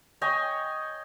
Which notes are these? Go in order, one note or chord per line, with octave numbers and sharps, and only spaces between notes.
C#5 D#5 G5 G#5